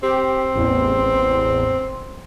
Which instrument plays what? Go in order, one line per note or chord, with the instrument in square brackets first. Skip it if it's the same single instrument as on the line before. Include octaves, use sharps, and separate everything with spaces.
[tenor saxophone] C4 [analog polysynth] G4
[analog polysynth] A1 E2